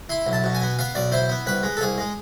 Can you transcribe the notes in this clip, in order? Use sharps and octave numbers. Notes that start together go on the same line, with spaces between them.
E4 C6
B1
A5
B2
G#5
B3
B3 F5
B1 D5
E4 C5
B3
C2 B4
G#3
A4
C2 G#4
G#3